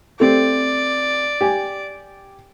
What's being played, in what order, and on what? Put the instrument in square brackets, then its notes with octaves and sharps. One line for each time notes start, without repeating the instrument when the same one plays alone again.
[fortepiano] A3 C4 G4 [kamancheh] D5
[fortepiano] G4 G#5